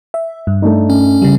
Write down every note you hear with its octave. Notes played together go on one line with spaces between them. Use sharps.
E5
G2
A3 D4 D#4
C#4
C#3 G3